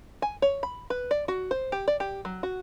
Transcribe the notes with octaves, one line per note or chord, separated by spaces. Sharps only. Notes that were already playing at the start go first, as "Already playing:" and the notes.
G#5
C#5
B5
B4
D5
F#4
C5
G4
D5
G4
F#3
F#4